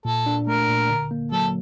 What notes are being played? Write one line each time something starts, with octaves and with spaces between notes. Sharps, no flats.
A#2 A4
D4
A3 A#4
A#2
D3
A#3
F#3 A4